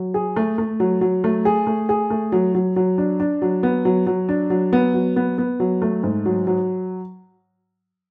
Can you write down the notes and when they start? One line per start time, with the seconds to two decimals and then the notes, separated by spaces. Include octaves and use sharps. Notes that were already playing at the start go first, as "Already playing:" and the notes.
Already playing: F#3
0.14 G#4
0.36 A3
0.58 A3
0.80 F#3
1.01 F#3
1.24 A3
1.45 G#4
1.67 A3
1.89 G#4
2.10 A3
2.32 F#3
2.55 F#3
2.76 F#3
2.98 D4
3.20 D4
3.42 F#3
3.63 B3
3.85 F#3
4.07 F#3
4.29 D4
4.50 F#3
4.73 B3
4.94 F#3
5.16 B3
5.38 B3
5.60 F#3
5.82 A3
6.03 G#2
6.25 F#3
6.47 F#3